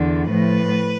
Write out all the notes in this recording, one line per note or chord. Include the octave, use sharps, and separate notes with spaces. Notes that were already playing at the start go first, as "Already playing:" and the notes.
Already playing: E2 D3
A2 F3 B4